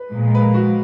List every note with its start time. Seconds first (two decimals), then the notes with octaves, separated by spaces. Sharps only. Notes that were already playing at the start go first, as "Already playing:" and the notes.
Already playing: B4
0.11 A#2 F3 G#3
0.35 B4
0.40 A#4
0.54 F#4